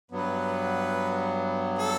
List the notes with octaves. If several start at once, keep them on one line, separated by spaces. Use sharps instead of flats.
G2 F#3 B3 B4
A4